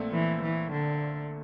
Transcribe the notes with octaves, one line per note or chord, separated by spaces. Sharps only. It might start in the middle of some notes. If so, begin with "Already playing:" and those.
Already playing: A#1 A#2 A3 C4
E3
E3
D3